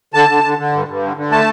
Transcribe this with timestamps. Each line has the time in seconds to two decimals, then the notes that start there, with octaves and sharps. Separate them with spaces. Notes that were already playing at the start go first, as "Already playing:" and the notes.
0.14 D3 A5
0.29 D3
0.44 D3
0.58 D3
0.73 G2
0.88 G2
1.03 D3
1.17 D3
1.31 A3 A5